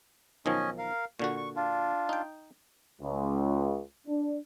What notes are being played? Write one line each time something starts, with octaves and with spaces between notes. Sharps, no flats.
B1 D#3 F3 C#4 D#5 G#5
A#4 F5
A#2 D3 F#4 C#6
C#6
D4 F4
D#4 G5
C#2
D4